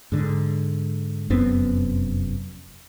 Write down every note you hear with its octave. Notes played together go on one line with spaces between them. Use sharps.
G#2 D3
F1 F#2 B3 C4